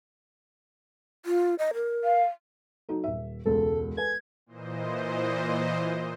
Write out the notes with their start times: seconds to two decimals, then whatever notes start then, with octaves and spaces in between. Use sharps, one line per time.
1.26 F4
1.59 D#5
1.74 A#4
2.04 F5
2.89 F#3 D#4 A4
3.04 D#1 E5
3.46 E1 C#2 A4
3.97 A4 B4 G#5 G#6
4.46 A#2 E3 C5 D#5